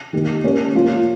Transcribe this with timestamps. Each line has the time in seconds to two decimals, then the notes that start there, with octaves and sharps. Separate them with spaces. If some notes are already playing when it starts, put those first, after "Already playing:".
0.13 D#3 A#3 D#4 G4
0.43 A#3 C#4 G4 A#4 C#5
0.75 F3 A#3 F4 A#4